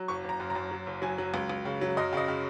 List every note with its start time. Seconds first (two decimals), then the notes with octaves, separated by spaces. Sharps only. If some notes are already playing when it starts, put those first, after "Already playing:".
Already playing: F#3
0.08 F#1 C#6
0.24 F#1
0.29 A#5
0.40 F#2
0.50 A#5
0.55 F#2
0.71 F#3
0.87 F#1
1.02 F#3 G#5
1.18 F#3
1.34 C#2
1.49 C#2
1.65 C#3
1.81 F#3
1.97 F#2 D#5
2.13 C#3 D#5
2.28 C#3